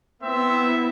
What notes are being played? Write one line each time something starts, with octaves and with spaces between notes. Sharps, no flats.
B3 C4 E4 E5